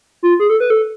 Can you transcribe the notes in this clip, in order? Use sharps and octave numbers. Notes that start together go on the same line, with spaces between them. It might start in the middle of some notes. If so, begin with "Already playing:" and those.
F4
G#4
A4
B4
A4